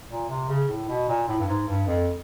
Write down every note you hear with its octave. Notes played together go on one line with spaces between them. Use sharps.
A#2
C3
C#3
A2
B2
A#2
A2
G2
G#2
G2
F2